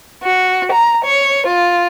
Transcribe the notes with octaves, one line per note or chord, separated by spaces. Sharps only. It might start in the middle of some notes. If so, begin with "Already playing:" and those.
F#4
A#5
C#5
F4